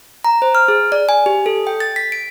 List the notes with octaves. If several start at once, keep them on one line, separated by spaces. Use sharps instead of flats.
A#5
C5
F6
G#4
D5
G#5
G4
A4
G5
A6
B6
D7